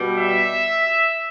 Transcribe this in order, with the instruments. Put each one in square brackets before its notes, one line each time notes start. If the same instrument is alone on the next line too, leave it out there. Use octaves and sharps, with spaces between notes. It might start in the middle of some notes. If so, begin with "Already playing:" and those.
Already playing: [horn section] B2 G3
E5